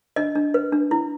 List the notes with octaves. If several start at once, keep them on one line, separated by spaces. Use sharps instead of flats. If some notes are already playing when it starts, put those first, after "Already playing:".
D4 D#5
D4
B4
D4
E4